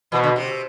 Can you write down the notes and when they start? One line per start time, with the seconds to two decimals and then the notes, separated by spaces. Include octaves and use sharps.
0.12 B2 E3
0.24 D3
0.36 C3